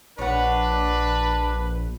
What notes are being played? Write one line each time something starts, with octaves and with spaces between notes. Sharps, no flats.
A#1 D4 B4 C#5 F#5